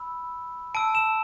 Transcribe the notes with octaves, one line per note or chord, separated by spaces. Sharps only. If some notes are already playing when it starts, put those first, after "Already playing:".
Already playing: B5 E6
A5 E6 D7
E7